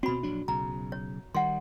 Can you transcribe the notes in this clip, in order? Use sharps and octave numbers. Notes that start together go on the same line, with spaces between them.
B2 C4 F#4 B5
A#1 F#3 D4
B1 C#3 A#5
C#5
D#3 G3 F#5 C6